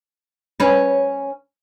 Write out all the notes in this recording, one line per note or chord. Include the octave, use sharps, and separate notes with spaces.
C#4 B4